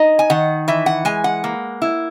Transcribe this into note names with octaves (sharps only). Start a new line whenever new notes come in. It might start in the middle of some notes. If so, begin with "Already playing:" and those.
Already playing: D#4 D#5
G#5
D#3 F#5
E3 E5
F#5
G#3 G#5
F#5
A#3
E4